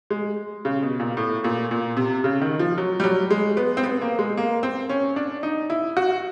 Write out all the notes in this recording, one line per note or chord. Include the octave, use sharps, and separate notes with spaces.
G#3
C#3
B2
A#2
A2
A#2
A#2
C3
C#3
D#3
F3
F#3
G3
F#3
G#3
B3
C4
B3
A#3
G#3
A#3
C4
C#4
D4
D#4
E4
F#4